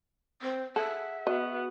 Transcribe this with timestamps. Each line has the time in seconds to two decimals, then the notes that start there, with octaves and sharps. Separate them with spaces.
0.42 C4
0.76 G#4 A4 E5 F#5
1.27 B3 F#4 D#5